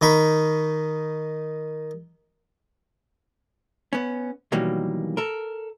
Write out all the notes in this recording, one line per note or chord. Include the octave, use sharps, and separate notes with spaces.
D#3 D#4 B5 C#6
B3 C#4
B2 D#3 E3 F#3 G3 A#3
A4 A#4